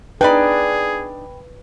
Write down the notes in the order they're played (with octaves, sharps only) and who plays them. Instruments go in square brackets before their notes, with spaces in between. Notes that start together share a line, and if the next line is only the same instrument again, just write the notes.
[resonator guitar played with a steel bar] D4 D#4 D5 [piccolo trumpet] G#4 [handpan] B4 [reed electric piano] G5 B5